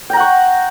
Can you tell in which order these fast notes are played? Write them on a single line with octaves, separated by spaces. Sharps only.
G5 A#5 F#5 C#6